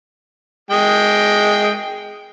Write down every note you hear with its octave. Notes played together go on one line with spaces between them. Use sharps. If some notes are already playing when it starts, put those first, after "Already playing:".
G#3 G5